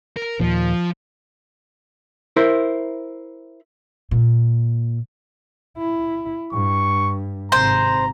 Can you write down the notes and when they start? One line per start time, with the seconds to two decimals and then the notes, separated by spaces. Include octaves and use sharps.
0.16 A#4
0.40 D#2 A#2 F3
2.36 E4 A#4 C5
4.11 A#2
5.78 E4
6.53 G2 C#6
7.52 G#1 C3 C5 A#5